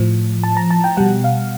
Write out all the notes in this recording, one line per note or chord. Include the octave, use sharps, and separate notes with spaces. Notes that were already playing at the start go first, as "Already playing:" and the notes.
Already playing: A2 F3
A5
A#5
A5
G5
B2 G3 F#5
F5